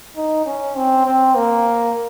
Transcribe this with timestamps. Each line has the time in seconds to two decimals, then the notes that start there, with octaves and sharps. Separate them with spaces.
0.16 D#4
0.46 C#4
0.76 C4
1.06 C4
1.35 A#3